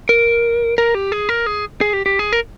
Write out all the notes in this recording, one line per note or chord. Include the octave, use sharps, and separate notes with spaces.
A#4
A#4
G4
G#4
A#4
G#4
G#4
G4
G4
G#4
A#4